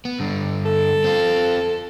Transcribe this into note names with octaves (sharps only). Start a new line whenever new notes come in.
B3
G2 D3
A4
C4 F4